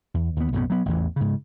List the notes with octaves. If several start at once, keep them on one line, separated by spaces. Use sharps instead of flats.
E2
D#2 B3
B1 F#2 A2 B3
F#3 B3
A1 E2 E3
G#2 C#3